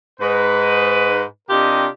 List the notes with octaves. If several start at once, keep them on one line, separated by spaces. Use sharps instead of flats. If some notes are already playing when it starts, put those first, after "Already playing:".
G#2 B4
C3 D4 F4 G4 A#4 D#5